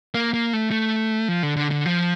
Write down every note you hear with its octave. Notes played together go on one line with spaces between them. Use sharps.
A#3
A#3
A3
A3
F3
D3
D3
D3
F3